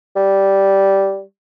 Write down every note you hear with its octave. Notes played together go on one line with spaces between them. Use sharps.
G3